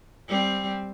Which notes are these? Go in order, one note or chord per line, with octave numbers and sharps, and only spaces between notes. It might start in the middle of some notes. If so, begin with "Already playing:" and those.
G3 C4